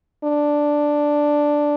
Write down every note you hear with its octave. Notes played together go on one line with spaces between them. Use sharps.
D4